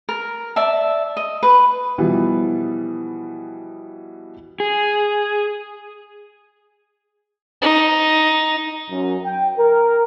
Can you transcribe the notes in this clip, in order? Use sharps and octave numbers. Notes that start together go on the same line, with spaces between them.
A#4
D5 E5 A5
D#5
B4
B2 E3 F3 G3 B3
G#4
D#4
F#2
G5
A#4